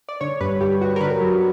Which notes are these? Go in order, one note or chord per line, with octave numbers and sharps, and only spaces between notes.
D5
D3 C#5
G2 B4
G2 G4
G2 F#4
A#4
D3 B4
F#3